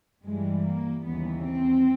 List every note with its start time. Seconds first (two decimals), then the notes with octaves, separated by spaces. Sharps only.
0.25 G2 E3 G3 G#3
0.65 A#3
1.04 D#2 C#3 E3 G3 B3
1.44 C4